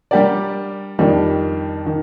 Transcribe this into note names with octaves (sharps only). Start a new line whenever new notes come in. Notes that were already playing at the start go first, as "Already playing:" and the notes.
G3 D4 G4 A#4 D5
F2 D#3 G3 D4
D#3